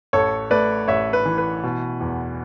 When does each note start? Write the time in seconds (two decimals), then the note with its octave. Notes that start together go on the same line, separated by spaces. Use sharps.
0.13 A1 A4 C#5
0.51 A3 B4 D5
0.88 A1 C#5 E5
1.13 B4
1.26 E3
1.38 B4
1.63 B2
2.01 E2